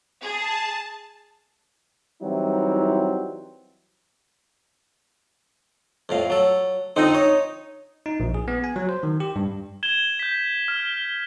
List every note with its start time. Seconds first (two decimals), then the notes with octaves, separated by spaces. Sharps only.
0.23 G#4 A5
2.22 E3 F#3 G3 C4 D#4 E4
6.09 F2 A2 F5
6.30 F#3 A4
6.96 F2 D3 C4 D#4
7.15 C#5
8.06 D#4
8.20 A#1
8.34 G#4
8.48 B3
8.64 G#5
8.76 F#3
8.89 C5
9.03 D#3
9.20 G4
9.36 G2
9.83 G#6 E7 G7
10.19 G6 B6
10.68 F6